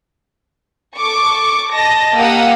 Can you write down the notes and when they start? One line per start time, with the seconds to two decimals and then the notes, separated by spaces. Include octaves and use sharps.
0.98 A4 C#6 D6
1.71 D#5 A5 A#6
2.17 A#3 G4 F5 F#5 D#6 E6